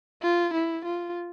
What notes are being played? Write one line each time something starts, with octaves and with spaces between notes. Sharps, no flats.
F4
E4
F4